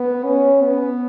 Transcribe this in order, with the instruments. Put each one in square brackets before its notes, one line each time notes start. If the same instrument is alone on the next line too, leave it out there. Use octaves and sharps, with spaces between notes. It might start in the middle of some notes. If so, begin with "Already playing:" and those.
Already playing: [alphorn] B3
C#4
B3